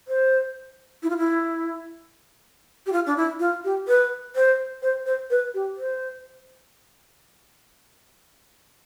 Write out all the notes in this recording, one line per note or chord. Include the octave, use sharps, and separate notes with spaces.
C5
E4
F4
E4
G4
F4
D4
E4
F4
G4
B4
C5
C5
C5
B4
G4
C5